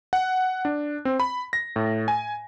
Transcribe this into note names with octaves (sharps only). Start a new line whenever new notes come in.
F#5
D4
C4
B5
A#6
A2
G#5